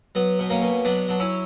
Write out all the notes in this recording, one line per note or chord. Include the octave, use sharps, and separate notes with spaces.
F#3 B3
B2
A#3 C#4
B2
F#3 B3 D4
F#3 D4
C#4 E4